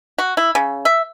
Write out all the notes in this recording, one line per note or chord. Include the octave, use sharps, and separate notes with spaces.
F#4
E4
C#3
E5